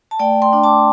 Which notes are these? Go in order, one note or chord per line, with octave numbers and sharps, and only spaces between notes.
A5
A3 D5 G5
G5 C6
D4
A5 D6